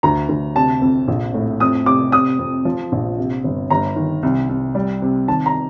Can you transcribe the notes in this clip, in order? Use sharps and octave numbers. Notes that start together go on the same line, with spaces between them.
D2 A#5
D2
C3 A5
F2
A#1
A2
F2 D#6
C3 D6
C3 D#6
F2
F3
A#1
C3
G1
G1 A#5
D#3
C2
C2
G3
C3
D#3 A5
A#5